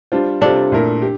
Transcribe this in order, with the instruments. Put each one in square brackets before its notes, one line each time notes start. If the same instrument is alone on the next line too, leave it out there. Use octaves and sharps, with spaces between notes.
[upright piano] G3 D4 F4 C5
[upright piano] C3 G3 C4 F4 A4 [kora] D4
[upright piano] A#2 A3 E4 A#4
G4